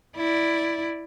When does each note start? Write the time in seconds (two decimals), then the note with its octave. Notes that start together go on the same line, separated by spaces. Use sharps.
0.16 E4 D5